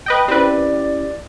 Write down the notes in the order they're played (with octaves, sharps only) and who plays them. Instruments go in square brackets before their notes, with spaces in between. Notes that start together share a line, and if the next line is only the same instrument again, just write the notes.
[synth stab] B4 D#5 G5
[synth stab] C4 B4 [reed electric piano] C#4 E4 G4 [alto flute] D5